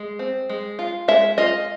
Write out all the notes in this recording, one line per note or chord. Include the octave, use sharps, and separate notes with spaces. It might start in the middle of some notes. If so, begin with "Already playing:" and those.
Already playing: G#3
C4
G#3
F4
G#3 E5
F4 D#5